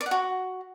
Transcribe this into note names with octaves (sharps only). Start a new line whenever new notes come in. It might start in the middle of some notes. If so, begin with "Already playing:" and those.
D5
F#5
F#4